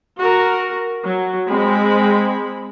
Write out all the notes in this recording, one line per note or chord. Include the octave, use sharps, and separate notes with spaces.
F#4 A#4
F#3
G#3 C4 B5